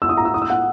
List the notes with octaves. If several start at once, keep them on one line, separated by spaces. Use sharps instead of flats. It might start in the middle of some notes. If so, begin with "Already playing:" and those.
E6
D#6
A#5
E6
D#6
E6
F#5